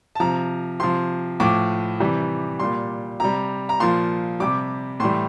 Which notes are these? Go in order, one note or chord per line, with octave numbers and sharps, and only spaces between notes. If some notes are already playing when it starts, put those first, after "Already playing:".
A5
C3 F3 A#5
C3 F3 C6
A2 F3 D6
C3 E3 G3
A#2 G3 C6
C3 G3 A#5
A#5
A#2 F3 C6
C3 G3 D6
A2 E3 G3 C6